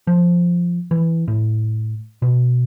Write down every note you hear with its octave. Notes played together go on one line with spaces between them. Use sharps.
F3
E3
A2
B2